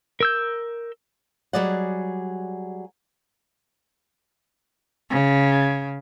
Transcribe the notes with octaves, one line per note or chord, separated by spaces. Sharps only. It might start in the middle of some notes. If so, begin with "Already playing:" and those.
A#4 E6 G6
F#3 G3 G#4 D5 D#5 F#5
C#3